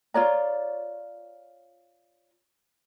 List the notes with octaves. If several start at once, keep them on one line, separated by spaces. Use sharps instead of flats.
F4 C#5 D5 A#5